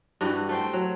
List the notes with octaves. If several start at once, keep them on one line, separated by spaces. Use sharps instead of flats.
G2 E3 F#4 G4
A3 C5 G5
F#3